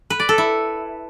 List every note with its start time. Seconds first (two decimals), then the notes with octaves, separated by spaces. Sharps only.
0.10 B4
0.20 D5
0.29 A4
0.38 E4